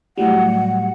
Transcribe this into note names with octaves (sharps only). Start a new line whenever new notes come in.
A2 F#3 G3 F#5